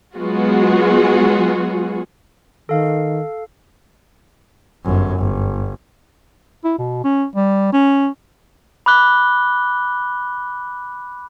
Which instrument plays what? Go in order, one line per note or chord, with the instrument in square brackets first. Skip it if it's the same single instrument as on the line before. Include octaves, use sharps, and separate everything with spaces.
[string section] F#3 G#3 B3 F4 F#4 G#4
[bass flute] D#3 [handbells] A4 F5
[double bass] G1 F#2
G1
[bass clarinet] E4
B2
C#4
G3
C#4
[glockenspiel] B5 D6 F#6 G7